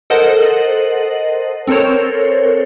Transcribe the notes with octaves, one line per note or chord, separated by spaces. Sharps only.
A4 A#4 C5 D#5 F#5
C4 A4 A#4 C5 C#5